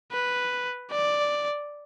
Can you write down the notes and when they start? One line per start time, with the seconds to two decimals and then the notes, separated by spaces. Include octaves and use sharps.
0.12 B4
0.92 D5